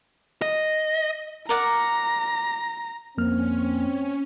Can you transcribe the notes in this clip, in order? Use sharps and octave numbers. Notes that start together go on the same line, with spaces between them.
D#5
A#4 D5 F#5 A#5
F2 A#3 C4 C#4 F6